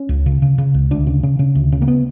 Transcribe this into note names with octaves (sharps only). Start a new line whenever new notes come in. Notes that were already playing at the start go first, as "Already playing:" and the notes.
Already playing: C#4
C#2
C#3
C#3
C#3
C#2
D2 D4
C#3
C#3
C#3
D2
C#3
A#3
B3